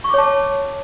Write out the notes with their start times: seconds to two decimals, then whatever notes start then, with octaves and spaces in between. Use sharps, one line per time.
0.04 C#6
0.09 D6
0.14 C#5
0.18 A5